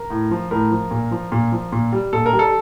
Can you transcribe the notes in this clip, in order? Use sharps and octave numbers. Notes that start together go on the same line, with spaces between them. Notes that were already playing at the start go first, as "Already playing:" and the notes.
Already playing: A#4
A2
F3
A2 A#4
F3
A#2
F3
A#2
F3
A#2
G3
A#2 A4
A#4
G3
A4